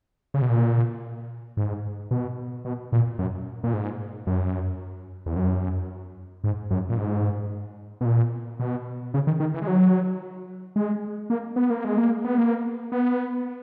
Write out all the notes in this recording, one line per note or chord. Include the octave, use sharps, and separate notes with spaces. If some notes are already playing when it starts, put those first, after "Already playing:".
C#3
B2
A#2
G#2
B2
B2
A#2
F#2
A#2
G#2
F#2
E2
F#2
G#2
F#2
A#2
G#2
B2
A#2
B2
C#3
D#3
D#3
E3
G#3
F#3
G#3
A#3
B3
A#3
G#3
A#3
B3
A#3
B3